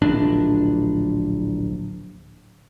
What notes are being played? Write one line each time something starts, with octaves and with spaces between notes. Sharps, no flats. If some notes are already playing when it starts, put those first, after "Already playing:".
D1 A#1 D4